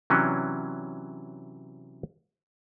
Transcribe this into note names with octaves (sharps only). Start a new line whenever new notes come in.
C3 E3 F#3 C#4 D4